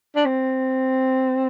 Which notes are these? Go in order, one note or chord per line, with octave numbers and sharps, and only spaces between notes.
D4
C4